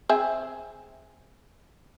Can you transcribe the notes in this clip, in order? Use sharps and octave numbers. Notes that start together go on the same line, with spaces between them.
C4 G#4 E5